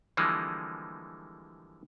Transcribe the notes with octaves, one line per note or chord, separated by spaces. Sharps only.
D3 E3 F3 G3 G#3 A#3